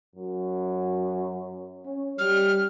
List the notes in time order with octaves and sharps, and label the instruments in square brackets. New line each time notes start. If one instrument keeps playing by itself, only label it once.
[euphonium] F#2
C#4
[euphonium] G3 [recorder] F6